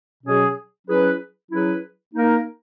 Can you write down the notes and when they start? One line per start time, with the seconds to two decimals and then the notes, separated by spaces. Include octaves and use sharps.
0.24 B2 F#3 C#4 G#4 C#5
0.87 F#3 C#4 E4 G#4 B4
1.51 F#3 C#4 E4 G#4 B4
2.14 A#3 D#4 A#4